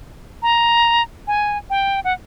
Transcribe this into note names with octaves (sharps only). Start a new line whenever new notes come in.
A#5
G#5
G5
F#5